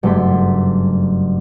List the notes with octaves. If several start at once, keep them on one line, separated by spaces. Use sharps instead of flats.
F#1 G2 A3 C6 D6 B6